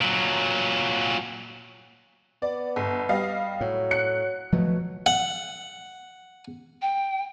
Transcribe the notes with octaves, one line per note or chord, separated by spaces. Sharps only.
A#2 F#3
B3 D5
G1
G3 D#5 F5
A2 F#3
F#6 C#7
B2 F3 F#3 A3
F#5
G5